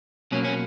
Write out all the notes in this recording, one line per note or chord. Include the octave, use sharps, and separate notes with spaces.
B2 F#3 A#3 C#4
C#4